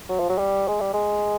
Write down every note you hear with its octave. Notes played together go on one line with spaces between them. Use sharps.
F#3
F3
F#3
G3
G#3
G3
G#3